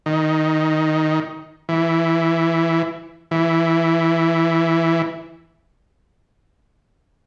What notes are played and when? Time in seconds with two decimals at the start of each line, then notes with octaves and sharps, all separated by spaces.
0.06 D#3
1.69 E3
3.31 E3